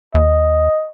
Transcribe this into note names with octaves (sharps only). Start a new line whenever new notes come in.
D#2 D#5